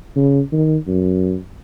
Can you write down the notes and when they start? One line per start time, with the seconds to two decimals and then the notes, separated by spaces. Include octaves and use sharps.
0.16 C#3
0.52 D#3
0.87 F#2